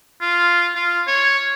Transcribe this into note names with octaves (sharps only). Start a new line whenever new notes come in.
F4
F4
C#5